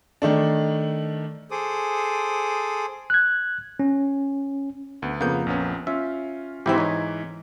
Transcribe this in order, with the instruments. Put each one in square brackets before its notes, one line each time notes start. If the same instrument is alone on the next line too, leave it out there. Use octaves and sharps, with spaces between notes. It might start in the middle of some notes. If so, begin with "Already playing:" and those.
[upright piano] D#3 A3 D4
[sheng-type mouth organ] G#4 A4 C5 D6 D#6
[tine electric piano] F#6 G#6
C#4
[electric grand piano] D2 B3
[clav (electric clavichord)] F2 A#3 [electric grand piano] C#3 B3 G6
[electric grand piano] A#1 B3 C#4
[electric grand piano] C#4 F4 [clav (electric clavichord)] E5
[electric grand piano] G#2 E3 B6 [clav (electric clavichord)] C4 E4 G4
[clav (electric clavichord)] D#4 C#5